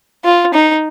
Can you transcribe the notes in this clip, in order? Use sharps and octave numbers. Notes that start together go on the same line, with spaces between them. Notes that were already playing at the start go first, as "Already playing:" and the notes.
F4
D#4